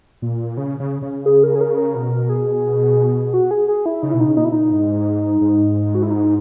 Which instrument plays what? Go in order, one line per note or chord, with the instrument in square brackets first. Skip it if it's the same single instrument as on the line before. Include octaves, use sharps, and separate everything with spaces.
[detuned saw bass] A#2
C#3
C#3
C#3
[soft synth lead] G#4
A#4
G#4
A#4
A#4
[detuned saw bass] B2 [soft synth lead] A#4
[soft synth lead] G#4
F#4
G#4
G#4
E4
[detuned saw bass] C#3 [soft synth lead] D#4
[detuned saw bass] B2 [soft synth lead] E4
[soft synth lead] D#4
[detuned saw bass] C#3
[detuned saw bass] A#2 [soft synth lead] D#4
[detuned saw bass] B2 [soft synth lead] E4
[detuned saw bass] A#2 [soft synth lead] D#4
[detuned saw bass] G#2
G#2
[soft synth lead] F#4
E4
D#4